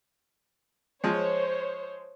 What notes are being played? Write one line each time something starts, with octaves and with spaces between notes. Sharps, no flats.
F3 G#3 C5 C#5